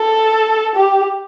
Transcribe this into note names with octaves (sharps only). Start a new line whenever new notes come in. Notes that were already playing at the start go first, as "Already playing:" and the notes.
Already playing: A4
G4